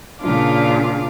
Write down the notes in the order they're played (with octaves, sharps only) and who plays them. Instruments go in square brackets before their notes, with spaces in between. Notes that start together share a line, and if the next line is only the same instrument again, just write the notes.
[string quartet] A#2 C#3 D4 F4 F5 D6